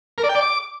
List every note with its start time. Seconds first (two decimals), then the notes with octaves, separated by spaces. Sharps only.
0.18 A#4
0.24 D5
0.29 G5
0.35 D5
0.41 D6